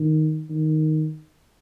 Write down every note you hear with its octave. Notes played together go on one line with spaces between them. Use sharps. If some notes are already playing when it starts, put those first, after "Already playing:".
Already playing: D#3
D#3